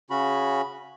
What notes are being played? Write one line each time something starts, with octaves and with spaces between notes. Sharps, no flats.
C#3 C#4 F#4 B5